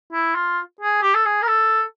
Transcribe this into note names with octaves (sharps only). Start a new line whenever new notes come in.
E4
F4
G#4
G4
A4
G#4
A#4
A4